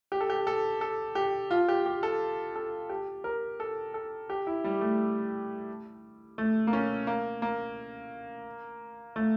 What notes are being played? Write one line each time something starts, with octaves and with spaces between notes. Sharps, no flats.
G4
A4
G4
A4
A4
G4
F4
G4
G4
A4
A4
G4
A#4
A4
A4
G4
E4
G3
A3
A3
A#3
C#4
A#3
A#3
A3